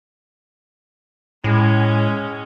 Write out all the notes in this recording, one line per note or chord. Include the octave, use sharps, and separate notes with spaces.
A2 G#3 C#4